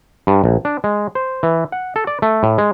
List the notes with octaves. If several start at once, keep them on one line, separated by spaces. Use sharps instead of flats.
G2
A#1
D4
G#3
C5
E3
F#5
A4
D5
A3
A2
G#3